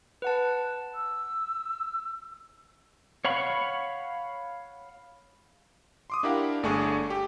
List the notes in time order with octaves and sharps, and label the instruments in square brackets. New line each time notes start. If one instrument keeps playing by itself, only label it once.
[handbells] B4 F#5 A5
[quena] E6
[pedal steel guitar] C#5 F5 F#5 B5 C#6
[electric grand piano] C6 D6 D#6
D4 E4 G4 A#4 F5 F#5
G1 A3 D4 G#4 C#6
G4